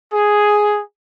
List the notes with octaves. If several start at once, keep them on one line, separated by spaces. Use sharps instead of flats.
G#4